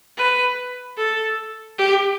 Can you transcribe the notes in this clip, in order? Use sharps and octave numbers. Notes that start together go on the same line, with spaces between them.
B4
A4
G4